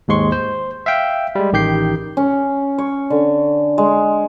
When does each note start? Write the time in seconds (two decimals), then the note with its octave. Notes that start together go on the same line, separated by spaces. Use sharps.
0.08 D#2 G#2 G#3 C6 C#6
0.32 C5
0.86 E5 F5 G5
1.35 G3 G#3
1.53 A1 D#3 G4 G6 C7
2.17 C#4
2.78 C#5
3.10 D3
3.78 G#3